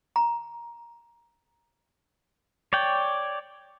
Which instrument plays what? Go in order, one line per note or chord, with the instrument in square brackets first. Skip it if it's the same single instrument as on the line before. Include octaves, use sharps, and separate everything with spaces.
[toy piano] A#5
[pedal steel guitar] C#5 D5 G5